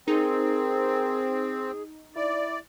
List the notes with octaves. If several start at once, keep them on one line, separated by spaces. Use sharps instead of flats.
C4 D#4 G#4 A#4
E4 D5